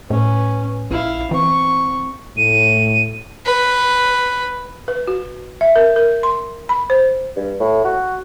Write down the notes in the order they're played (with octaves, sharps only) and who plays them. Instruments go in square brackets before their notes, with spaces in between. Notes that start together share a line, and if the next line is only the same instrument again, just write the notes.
[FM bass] A2 [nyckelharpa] C#4 B4
[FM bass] A#1 [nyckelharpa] E4 F5
[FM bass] E3 [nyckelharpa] C4 C#6
[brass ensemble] A2 [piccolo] D#7
[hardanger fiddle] B4
[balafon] B4
F#4
E5
A#4
A#4
C6
B5
C5
[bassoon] G2
A2
F#4